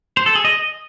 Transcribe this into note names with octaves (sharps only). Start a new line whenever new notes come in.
C5
A4
G#4
D#5